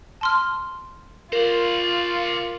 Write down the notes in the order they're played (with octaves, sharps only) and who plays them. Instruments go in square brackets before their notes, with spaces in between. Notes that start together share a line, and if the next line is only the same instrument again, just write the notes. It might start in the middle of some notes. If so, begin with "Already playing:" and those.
[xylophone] A5 C6 F6
[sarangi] F4 [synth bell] A#4 [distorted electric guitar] C5 D5